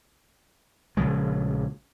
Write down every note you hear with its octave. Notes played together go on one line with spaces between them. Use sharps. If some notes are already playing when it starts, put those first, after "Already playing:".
A#1 C#3 F3 G#3